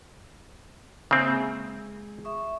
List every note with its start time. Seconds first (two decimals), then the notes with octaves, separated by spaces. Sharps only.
1.11 C#3 A#3 C4 E5
1.30 G#3 G#4
2.24 E5 C#6 D#6